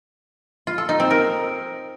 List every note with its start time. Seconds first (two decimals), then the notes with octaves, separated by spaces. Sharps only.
0.67 F4
0.78 A4
0.89 D#4
1.00 C4
1.10 A#4